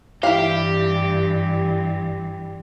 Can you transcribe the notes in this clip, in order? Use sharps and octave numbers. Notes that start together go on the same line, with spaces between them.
G2 E3 E4 G4 F5